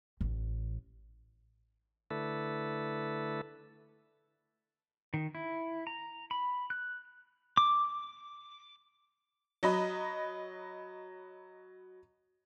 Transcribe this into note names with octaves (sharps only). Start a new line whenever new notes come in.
A1
D3 A3 E4 A4 B4
D#3
E4
A#5
B5
F#6
D6
F#3 D#5 B5